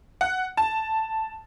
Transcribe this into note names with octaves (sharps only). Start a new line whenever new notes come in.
F#5
A5